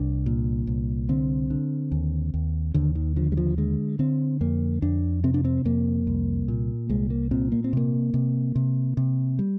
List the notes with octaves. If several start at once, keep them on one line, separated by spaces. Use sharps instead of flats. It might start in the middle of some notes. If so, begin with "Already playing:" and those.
Already playing: C2 D4
A#2
C2
D3 C4
D3
D#2
D#2
D#2 D3
D#3
D3 F3
G3
F3
D3 G#3
D3 C4
F2 A#3
F2 D4
C3 C4
D4
C4
F2 A#3
C2
A#2
C2 G#3
A#3
A#2 C4
A#3
C4
C3 A#3
C3
C3
C3
G3